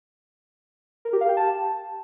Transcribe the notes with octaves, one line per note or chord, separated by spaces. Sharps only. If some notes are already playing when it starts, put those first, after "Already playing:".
A#4
G4
F5
G5
A5